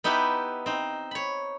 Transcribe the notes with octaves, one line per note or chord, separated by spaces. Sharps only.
B3 D#4 E4 G4 B4
C4 D#4
C#5 B5